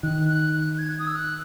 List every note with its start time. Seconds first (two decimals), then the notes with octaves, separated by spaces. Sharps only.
0.03 D#3 F#6
0.29 F#6
0.53 F#6
0.78 G#6
0.99 D#6
1.07 E6
1.15 F#6